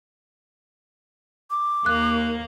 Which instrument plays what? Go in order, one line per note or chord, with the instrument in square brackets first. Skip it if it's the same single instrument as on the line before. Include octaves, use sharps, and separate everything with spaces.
[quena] D6
[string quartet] D#2 A#3 [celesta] F#6